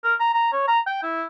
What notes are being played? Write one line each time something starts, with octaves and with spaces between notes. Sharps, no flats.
A#4
A#5
A#5
C#5
A#5
G5
E4